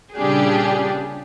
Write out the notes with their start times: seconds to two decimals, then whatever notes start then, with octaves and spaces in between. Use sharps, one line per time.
0.16 A#2 C#3 G3 D4 G4 G#4